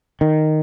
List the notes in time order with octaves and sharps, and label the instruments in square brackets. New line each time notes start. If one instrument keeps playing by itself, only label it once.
[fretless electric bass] D#3